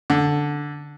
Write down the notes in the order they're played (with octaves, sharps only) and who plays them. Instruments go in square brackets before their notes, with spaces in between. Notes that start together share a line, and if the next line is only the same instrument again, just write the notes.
[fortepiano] D3